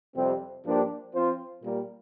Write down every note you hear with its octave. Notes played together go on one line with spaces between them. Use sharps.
F2 C3 G3 C4
G2 F3 A#3 D4 G4
F3 C4 F4 C5
A#2 G3 A#3